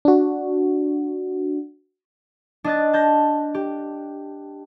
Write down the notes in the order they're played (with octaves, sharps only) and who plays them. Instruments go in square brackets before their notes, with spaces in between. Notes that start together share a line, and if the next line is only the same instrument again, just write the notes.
[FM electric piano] D4 F#4
[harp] D4 D#5 F#6 A6
A5 G6 A#6
G4